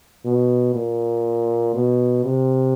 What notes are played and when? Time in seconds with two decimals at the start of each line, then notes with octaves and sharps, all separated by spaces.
0.25 B2
0.75 A#2
1.74 B2
2.24 C3